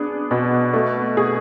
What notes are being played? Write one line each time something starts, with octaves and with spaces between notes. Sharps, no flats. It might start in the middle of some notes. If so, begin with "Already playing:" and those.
Already playing: B3 D4 G#4
B2
A3
G#4